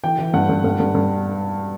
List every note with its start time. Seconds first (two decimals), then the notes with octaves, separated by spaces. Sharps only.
0.03 E3 G5
0.18 E3
0.34 G2 F#5
0.49 G2
0.64 G2
0.80 G2
0.95 G2